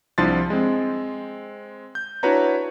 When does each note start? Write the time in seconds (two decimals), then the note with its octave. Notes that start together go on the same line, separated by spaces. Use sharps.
0.18 C2 F3 D4 E4 C6 A6
0.50 G#3 C4
1.95 G6
2.23 D4 E4 F#4 B4 C#5 A#5